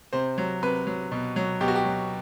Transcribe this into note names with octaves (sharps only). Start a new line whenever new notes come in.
C3 C5
F#3
C3 B4
F#3
B2
F#3
B2 G4
F#4
G4
F#3